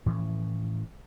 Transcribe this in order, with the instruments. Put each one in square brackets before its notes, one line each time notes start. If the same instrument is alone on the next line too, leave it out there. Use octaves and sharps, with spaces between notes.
[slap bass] A2 E3 F3 C#4